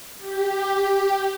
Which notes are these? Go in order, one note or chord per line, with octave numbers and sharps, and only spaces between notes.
G4